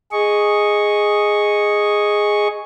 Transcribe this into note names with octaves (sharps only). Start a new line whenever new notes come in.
G#4 D#5 C#6